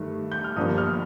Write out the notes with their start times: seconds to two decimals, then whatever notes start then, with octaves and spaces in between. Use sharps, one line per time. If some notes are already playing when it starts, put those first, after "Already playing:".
Already playing: G2 D#3 A3
0.32 G6
0.44 F6
0.56 G1 G2 F3 A#3 D4 D#6
0.78 F6